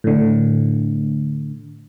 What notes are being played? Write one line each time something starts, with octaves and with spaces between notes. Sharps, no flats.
A2 D3